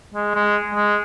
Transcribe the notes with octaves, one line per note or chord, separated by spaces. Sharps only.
G#3
G#3
G#3